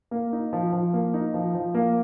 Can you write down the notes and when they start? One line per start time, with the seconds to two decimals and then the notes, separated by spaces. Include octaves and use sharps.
0.11 A#3
0.33 D#4
0.53 F3
0.73 F3
0.93 A#3
1.14 D#4
1.34 F3
1.54 F3
1.74 A#3